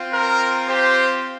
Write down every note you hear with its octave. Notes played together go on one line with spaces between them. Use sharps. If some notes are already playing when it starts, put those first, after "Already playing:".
Already playing: C4 F4
A#4
G4 C5